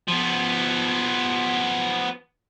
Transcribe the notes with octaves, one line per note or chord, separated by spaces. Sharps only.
F3 B3